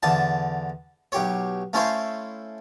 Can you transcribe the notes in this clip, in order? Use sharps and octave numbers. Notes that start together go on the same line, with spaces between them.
E2 D3 A5
B1 G4 C#5
A3 C#4 E4 C5 F5